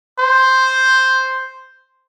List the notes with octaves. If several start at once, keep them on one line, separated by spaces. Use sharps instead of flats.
C5